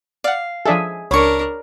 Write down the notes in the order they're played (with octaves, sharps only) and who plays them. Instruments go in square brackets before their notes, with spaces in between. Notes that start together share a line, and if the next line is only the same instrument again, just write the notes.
[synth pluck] D5 F#5 [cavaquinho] F5
[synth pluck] F3 D4 A4 [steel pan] G#4 E5
[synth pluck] C#2 [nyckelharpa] D4 A#4 [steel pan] C#5 [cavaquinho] B5 C#6